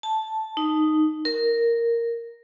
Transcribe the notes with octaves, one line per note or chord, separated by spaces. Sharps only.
A5
D#4
A#4